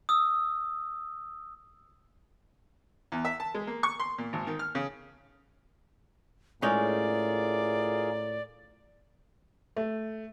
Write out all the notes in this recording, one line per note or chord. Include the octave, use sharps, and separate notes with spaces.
D#6 E6
E2
E5
A5
G#3
A#3
C#6
C6
A#2
G#1
D#3
F6
C#3
A2 G#3 C#4 D#4 F4 G#4 A#4 D5
A3